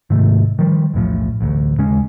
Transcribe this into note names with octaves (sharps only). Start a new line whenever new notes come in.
G#2 C3 D#3 A3
D#3 F3 G3
B1 E2 A2 F3
A1 D2
D#2 C#3 G#3 C#4